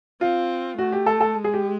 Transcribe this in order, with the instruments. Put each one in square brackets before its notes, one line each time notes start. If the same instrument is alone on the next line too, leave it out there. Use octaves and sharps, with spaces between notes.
[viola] C4 [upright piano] F4
[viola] A3 [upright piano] F#4
[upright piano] G4
A4
A4
[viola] G#3
[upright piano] G#4
G4